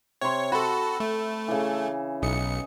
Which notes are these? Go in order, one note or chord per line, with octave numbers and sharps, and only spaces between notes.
C3 C#5 C6
F#4 A4 B5
A3
C#3 E3
B1 D#5 C#7